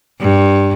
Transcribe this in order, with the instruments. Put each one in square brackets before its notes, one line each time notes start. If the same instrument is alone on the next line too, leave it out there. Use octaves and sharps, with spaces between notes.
[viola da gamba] G2